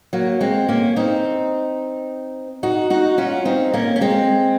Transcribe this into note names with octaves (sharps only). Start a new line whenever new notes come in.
F#3 A#3
G#3 C4
A#3 C#4
C4 D#4
D#4 F#4
D#4 F#4
C#4 F4
C4 D#4
A#3 C#4
C#4
G#3 C4